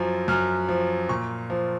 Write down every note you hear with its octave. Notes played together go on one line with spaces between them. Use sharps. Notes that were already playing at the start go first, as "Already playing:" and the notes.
Already playing: F#2 F3
F#2 F6
F3
A#2 C#6
F3